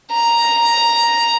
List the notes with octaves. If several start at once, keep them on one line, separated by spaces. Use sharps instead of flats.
A#5